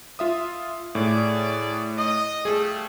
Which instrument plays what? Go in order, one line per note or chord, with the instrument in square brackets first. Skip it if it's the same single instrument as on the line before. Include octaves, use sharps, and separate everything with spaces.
[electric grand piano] F4 E5 D#6
[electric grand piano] A2 [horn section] G#4 D5
[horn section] D#5
[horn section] F3 G3 A3 [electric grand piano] G#4